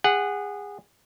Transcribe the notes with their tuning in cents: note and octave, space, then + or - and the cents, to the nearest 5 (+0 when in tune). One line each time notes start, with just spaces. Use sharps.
G#4 -25 F#5 +0